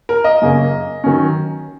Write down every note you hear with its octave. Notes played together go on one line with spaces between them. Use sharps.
A#4
D#5
F#2 C#3 A#3 C#4
D#3 F#3 C#4